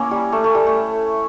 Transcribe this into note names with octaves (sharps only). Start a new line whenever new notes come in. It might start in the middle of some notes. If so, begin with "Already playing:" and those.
Already playing: A#3 C#4 E4
G3
A3
A3
G3
A3